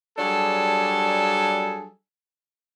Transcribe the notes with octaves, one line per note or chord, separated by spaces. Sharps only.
F#3 G3 D4 G#4 A4